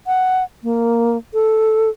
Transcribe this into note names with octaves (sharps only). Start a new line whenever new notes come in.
F#5
A#3
A4